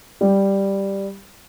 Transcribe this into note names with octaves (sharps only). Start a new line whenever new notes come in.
G3